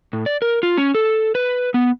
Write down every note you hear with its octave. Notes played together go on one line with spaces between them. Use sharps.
A2
D5
A#4
F4
C#4
A4
B4
B3